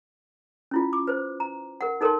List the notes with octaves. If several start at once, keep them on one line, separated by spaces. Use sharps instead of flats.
C#4 E4 F4
D6
B4 C5
A#5
A#4 F#5
D#4 A4 A#4 C#5 A5 C6